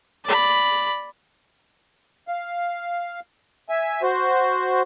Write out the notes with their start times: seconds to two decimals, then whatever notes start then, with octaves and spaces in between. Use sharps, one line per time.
0.24 D5 B5
2.28 F5
3.69 E5 G#5
4.02 F#4 C5